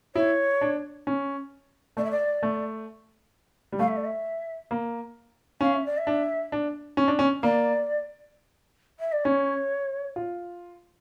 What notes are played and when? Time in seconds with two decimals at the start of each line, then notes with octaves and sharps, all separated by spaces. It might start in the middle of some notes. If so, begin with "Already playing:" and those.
0.15 E4 C#5
0.61 D4
1.07 C#4
1.97 A3 D5
2.04 E5
2.11 D5
2.43 A3
3.72 G3
3.79 A3 F5
3.88 E5
3.97 D5
4.05 E5
4.71 A#3
5.61 C#4 F5
5.74 E5
5.86 D5
5.98 E5
6.07 D4
6.52 D4
6.97 C#4
7.08 D4
7.19 C#4
7.43 A#3 D5
9.00 E5
9.12 D5
9.24 C#4 C#5
10.16 F4